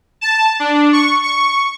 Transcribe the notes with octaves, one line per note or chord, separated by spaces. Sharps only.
A5
D4
C#6
C#6